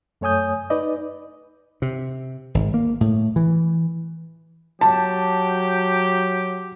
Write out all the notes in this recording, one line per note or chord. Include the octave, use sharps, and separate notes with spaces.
F#2 A3 C#5 G#5 D#6 G6
D#4 B4 D5 D#5
C3
G#1
A#3
A2
E3
F#3 G4 A5